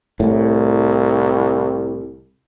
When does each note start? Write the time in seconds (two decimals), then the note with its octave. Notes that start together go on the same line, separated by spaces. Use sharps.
0.20 C2 A2